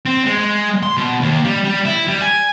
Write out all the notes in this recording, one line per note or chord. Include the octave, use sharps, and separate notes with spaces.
C4
G#3
G#3
C6
B2
D#2
G3
G3
E4
G3
G#5